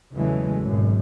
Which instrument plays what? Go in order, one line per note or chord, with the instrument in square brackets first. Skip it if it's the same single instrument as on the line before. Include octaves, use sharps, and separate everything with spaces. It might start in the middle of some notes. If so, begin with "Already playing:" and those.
[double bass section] E2 C#3 E3 F#3 G#3 A3
G#1 F#2 B2